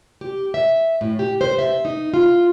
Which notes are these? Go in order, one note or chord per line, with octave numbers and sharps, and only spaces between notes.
G4
E5
A2
G4
C5
E5
D#4
F4